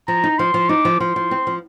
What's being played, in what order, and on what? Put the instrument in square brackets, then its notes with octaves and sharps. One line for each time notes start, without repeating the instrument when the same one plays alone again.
[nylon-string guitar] F3 [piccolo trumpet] A#5
[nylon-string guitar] D#4
[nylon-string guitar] F3 [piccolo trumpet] C6
[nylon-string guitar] F3
[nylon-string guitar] D#4 [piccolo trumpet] D6
[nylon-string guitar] F3
[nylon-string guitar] F3 [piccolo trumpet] C6
[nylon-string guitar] F3
C4
F3